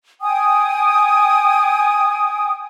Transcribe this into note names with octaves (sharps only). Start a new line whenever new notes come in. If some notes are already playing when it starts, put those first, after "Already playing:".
G5 G#5 D#6